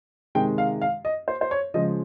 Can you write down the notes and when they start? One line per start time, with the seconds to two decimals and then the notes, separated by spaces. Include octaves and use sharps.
0.35 C3 D#3 G#3 G5
0.58 F5
0.81 F5
1.05 D#5
1.28 C5
1.41 C5
1.51 C#5
1.74 C#3 F3 G#3 D#5